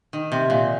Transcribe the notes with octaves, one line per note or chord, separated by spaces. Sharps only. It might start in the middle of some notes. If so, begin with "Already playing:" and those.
D#3
C3
A#2